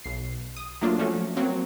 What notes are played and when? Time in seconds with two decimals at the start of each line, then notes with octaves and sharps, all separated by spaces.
0.04 B1 C7
0.57 D#6
0.81 F#3 A3 A#3 D4 F4
0.98 F3 A3 C#4 F#4
1.37 F#3 A#3 C4